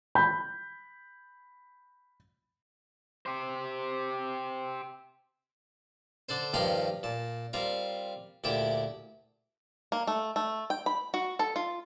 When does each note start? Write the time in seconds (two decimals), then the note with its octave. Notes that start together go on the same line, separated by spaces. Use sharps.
0.15 B5 G6
3.26 G4 C5
6.29 D3 D4 A4 C5
6.54 G2 D#3 F3 G4 A#5 C6
7.03 A#2 A5
7.53 G3 C4 F4 A#4
8.44 D2 A#2 E4 G4 A5 D6
9.92 A#3
10.07 A3
10.36 A3
10.70 G5
10.86 B5
11.14 F#4
11.39 A4
11.56 F4